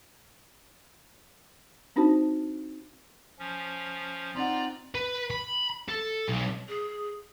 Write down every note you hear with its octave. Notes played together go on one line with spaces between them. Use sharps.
C4 D4 D#4 F#4 C5 A5
F3 C#4
C4 D#4 F4 D5 F#5 A#5
B4
B5
A4
B1
G#4